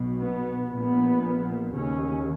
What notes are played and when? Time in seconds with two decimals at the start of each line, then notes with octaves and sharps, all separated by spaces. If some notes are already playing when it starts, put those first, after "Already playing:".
Already playing: B1 B2
0.23 B3
0.73 A#1 A#2 B3
1.73 D#2 C#3 C#4